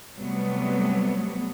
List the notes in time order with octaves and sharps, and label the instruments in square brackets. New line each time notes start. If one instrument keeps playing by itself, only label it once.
[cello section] C3 F#3 G3 A3 B3